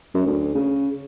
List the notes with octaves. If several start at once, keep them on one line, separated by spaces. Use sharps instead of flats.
F#2
D2
C#3